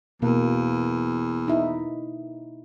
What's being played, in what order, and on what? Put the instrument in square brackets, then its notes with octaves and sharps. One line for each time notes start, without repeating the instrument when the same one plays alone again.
[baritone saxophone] E2 [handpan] B2 A#3
[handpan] D#4 E4